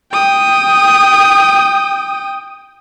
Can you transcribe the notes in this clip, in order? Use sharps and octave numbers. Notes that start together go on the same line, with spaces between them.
G5 D#6